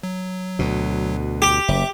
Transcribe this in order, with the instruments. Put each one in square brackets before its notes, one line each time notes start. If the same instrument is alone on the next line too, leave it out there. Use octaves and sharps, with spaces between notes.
[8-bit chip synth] F#3
[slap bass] D2 B2
[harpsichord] G4
[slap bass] F#1 [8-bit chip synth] E5 D6